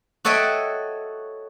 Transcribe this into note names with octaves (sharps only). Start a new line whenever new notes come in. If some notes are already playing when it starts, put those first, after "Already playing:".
F#4 A4 C#5 D#5 E5 G5